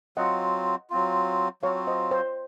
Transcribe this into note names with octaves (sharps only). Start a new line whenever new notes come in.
F#3 C4 F4 D#5 F#5
F#3 C4 F4
F#3 C4 F4 C#5 F5
C5 D#5
C5